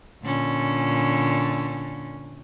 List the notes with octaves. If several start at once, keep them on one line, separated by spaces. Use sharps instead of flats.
A#2 D3 C#4